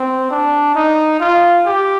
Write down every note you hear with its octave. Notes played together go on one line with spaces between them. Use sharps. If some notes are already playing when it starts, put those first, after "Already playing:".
Already playing: C4
D4
D#4
F4
G4